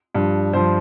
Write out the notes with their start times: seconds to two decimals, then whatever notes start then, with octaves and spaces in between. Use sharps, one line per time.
0.14 G2 F3
0.53 G2 F3 C5